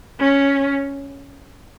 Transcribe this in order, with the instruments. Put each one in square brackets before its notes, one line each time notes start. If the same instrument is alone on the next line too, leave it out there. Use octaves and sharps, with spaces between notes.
[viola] C#4